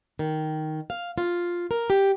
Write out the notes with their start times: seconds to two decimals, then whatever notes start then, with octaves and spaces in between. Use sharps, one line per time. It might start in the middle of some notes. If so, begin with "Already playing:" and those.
0.19 D#3
0.90 F5
1.18 F4
1.71 A#4
1.90 G4